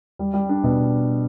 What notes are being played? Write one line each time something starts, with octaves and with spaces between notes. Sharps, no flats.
G3
G3
D4
B2